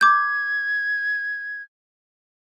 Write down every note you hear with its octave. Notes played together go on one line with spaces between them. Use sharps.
D6 G6 G#6